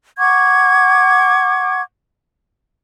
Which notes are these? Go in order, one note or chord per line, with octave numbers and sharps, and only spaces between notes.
F#5 C#6 D6 G#6